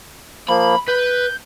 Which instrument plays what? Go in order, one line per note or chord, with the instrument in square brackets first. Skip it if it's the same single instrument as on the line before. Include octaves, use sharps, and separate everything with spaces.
[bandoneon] F3 A#3 [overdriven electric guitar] B5
[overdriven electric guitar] B4 [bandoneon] G6